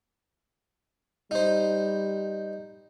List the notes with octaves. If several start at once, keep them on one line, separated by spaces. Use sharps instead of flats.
G3 D#4 C5